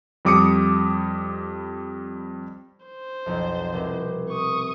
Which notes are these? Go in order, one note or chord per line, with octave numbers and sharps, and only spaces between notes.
F2 G3 D6 D#6 C#7
C5
B1 F2
C2 B2
C#6 D#6